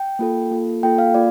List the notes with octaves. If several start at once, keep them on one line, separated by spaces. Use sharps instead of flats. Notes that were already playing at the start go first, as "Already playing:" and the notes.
Already playing: G5
A#3 F4 A4
A#3 F4 A4
A#3 F4 A4 G5
F5
A#3 F4 D5